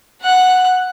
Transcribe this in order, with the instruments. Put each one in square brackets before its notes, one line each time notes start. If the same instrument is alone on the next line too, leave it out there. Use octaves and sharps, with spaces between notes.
[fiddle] F#5 F#6